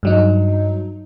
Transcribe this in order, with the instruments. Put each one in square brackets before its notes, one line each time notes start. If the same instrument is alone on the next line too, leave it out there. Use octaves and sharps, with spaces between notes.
[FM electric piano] G2 F#3 D#4